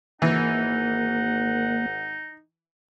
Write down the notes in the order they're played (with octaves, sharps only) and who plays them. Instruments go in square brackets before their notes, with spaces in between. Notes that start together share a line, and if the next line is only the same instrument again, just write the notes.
[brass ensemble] G#1 F#5 [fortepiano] E3 [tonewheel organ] A#3 [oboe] D#4